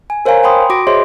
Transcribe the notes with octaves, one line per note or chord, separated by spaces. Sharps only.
G#5
A#4 C5 C#5 F5 G#5 A#5
G5 B5 C6 D#6
F#4 D6 A#6 D7
G#4 C5 C#5 D#5 E5 C6